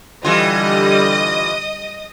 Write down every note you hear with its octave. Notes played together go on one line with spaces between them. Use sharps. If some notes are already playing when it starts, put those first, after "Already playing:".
D3 E3 G3 F4 D#5 D#6